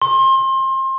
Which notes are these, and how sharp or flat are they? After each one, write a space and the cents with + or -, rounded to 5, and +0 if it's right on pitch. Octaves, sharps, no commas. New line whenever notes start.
C6 +30